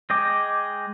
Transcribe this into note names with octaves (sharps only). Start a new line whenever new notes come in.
G#3 D#5 G5 D6